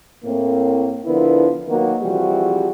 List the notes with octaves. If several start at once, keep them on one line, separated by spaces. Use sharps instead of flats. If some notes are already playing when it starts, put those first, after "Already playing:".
A2 A#3 C4
D3 F3 B3 E4 A#4 B4
D#3 F#3 A#3 B3 F#4
C3 E3 F3 G3 F#4 G#4